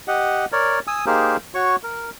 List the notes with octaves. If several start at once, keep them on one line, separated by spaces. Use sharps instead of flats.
G4 D#5 F#5
A#4 C#5 D5
G#5 D#6 E6
A#3 D#4 G4 G#4 A#4 C5
F#4 C#5 C#6
A#4